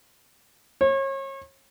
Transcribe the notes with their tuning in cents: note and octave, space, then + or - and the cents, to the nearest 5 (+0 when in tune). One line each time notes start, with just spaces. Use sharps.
C#5 -35